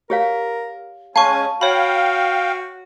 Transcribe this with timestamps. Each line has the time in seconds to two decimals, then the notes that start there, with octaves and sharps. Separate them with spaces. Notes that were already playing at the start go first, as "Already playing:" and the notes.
0.10 G4 A#4 C#5 F5
1.16 G#3 C#4 F5 G#5 A5 C#6
1.61 F#4 C#5 F5 G5 B5